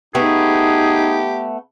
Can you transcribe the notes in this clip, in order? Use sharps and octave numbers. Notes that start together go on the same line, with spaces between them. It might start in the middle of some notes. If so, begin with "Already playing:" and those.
A3 B3 D#4 G4 G#4